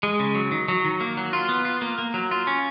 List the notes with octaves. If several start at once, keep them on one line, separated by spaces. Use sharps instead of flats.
G#3
C#3
F#3
D#3
F#3
D#3
A#3
F#3
F4
B3
F4
A#3
A#3
F#3
F4
C#4